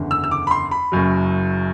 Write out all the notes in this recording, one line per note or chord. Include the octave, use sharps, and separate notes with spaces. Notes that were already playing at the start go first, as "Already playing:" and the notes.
Already playing: F#1 E2 D3
E6
E6
D6
B5
C6
B5
F#1 F#2 F#3